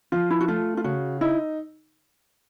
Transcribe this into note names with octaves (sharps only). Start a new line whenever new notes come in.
F3 F4
E4
F#4
A3 F4
F4
C#3 F#4
D#4 E4